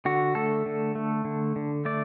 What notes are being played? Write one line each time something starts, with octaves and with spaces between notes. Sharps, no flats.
D3 F#4
A3 A4
D3
A3
D3
D3
A3 D5